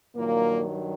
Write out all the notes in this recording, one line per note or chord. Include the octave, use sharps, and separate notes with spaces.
G2 A#2 D#3 F#3 A#3